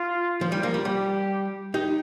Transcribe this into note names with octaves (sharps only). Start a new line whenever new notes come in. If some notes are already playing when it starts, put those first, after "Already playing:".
Already playing: F4
F3
G3
F3 A#3
G3
G3 G4
D#4 G4